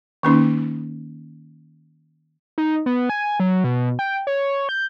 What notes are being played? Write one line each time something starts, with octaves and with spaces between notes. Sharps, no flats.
D#3 A#3 C#4 D#4
D#4
B3
G#5
F#3
B2
G5
C#5
G6